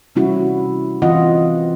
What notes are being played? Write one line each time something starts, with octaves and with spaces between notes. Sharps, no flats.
C3 G3 C#4 E4 F#4
E3 C4 F4 D#5 F#5